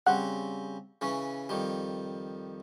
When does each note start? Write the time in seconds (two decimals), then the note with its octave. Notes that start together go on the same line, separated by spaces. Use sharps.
0.07 C#3 G3 C4 F#5
1.01 C#3 E3 C#4
1.49 F2 D#3 G3